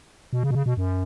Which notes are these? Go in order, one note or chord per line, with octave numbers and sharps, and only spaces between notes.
B2
C#3
B2
C#3
B2
F#2